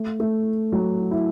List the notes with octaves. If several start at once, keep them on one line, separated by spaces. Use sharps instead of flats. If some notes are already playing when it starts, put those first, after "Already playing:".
Already playing: A3
A3
F#3
E4